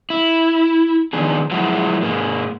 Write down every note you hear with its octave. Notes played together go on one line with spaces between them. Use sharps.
E4
D#3 F3 B3 D4 G#4
F3 F#3 G#3 E4 F#4
G#2 G#3 A#3